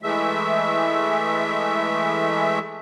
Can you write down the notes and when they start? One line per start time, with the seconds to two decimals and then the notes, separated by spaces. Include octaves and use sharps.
0.02 E3 G#3 A3 E5